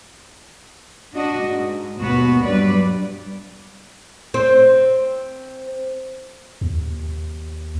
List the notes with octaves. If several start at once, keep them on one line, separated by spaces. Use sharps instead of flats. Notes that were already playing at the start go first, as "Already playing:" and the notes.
D4 F#4 D#5
G#2
D#2 G#2 B2 B3 F#4
G2 F#3 G3 B4 D5
C4 C5
D#2